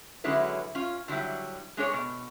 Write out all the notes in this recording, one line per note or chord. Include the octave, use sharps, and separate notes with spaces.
D3 F#3 G#3 C#4 E4 B4
C#4 F4
D3 F#3 G3 E4
G#3 D4 G#4 C#5
B2